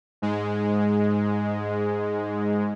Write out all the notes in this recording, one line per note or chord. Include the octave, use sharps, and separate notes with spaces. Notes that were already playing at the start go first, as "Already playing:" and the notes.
G#2 G#3